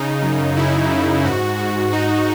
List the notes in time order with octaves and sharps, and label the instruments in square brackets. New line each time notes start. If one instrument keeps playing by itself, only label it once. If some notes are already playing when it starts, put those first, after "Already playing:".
Already playing: [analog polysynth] C#3 D#4
F#2
C#3 E4
F#2
G#2 F#4
G#2
G#2 D#4